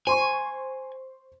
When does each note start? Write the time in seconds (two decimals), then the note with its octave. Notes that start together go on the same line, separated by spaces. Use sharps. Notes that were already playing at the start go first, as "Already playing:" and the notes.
0.07 C5 G#5 C6 C#6